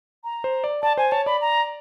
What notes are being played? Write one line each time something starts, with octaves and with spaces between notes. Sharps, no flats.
A#5
C5
D5
D5 A5
C5 G#5
C#5 A5
D5 B5
A#5